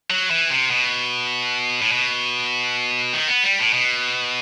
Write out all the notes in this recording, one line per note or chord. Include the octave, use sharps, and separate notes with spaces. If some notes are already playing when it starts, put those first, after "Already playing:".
F#3
E3
C3
B2
A2
B2
D#3
B3
G3
A2
B2